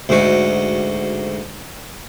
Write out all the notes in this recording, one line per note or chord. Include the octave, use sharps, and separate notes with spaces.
D2 G#2 F#4